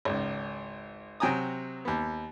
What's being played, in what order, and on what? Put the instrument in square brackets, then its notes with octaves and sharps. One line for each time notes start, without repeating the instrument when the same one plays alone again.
[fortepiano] G#1 C#2
C3 F#3 G5 G#5 A#5 D#6
D#2 B3